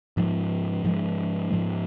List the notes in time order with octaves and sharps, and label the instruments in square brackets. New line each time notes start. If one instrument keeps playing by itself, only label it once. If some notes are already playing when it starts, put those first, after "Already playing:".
[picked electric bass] G#2 F3 G#3
G#2 F3 G#3
G#2 F3 G#3